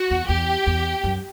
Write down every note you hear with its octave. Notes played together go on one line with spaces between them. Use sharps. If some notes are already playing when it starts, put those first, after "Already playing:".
Already playing: F#4
E2
E2 G4
E2
F#2